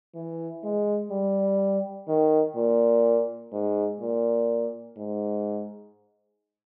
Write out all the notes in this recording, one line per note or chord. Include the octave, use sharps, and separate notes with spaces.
E3
G#3
G3
D#3
A#2
G#2
A#2
G#2